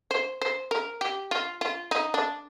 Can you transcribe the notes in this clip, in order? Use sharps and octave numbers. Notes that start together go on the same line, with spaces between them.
C5
C5
A#4
G4
F4
F4
D#4
D4